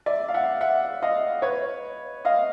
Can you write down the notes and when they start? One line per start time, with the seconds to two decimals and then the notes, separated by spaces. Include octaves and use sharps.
0.06 D5 E5
0.28 F5
0.34 E5 F#5
0.61 E5 F#5
1.02 D#5 F5
1.42 B4 C#5
2.25 D#5 F5